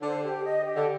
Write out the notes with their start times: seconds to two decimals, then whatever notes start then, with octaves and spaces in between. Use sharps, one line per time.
0.02 D3 C5
0.23 G4
0.44 D#5
0.65 G4
0.75 D3